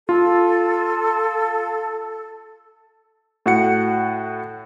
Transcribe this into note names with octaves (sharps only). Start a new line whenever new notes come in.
F4 A4
A2 F#4 F#5 C#7